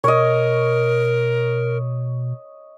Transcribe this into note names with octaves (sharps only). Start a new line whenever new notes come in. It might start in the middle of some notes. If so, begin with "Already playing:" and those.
B2 A#4 C#5 D#5